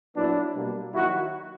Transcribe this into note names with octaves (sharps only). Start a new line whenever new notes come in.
A#2 F#3 B3 D4 E4
B2 G3 A#3
D#3 F#3 A#3 E4 F#4